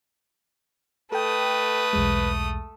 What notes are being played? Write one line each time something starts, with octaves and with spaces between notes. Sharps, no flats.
A3 A4 B4 G5 D#6
B1 E2 G#3